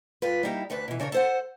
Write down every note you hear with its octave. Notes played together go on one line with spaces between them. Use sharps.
G2 F4 B4
G3 A#3 B3 D#4 E4 G4
D2 A3 D4 B4
B2 E3
C#3 D4 A#4 C#5
A4 C5 F#5